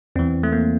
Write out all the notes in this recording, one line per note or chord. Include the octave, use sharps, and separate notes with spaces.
E2 E3 C4
A3
A#3